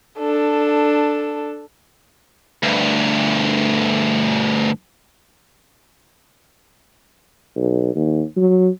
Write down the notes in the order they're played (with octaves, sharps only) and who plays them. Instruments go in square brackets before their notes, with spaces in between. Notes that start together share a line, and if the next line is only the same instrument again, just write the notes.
[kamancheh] D4 A4
[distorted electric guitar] D2 G2
[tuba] B1
D#2
F#3